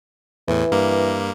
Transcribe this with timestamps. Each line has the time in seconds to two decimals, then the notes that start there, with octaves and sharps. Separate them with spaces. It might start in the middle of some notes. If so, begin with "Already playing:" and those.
0.48 E2 A2 E3
0.72 G2 A#3